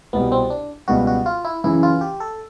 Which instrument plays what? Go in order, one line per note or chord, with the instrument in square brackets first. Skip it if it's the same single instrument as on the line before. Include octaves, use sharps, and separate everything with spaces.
[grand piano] C2 B2 G3 [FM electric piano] B3
[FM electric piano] C4
D4
[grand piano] C#2 B2 G3 B3 [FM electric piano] F#4
[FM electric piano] F#4
F4
E4
[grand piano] F#2 C#3 E3 [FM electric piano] E4
[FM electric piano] F4
G4
A4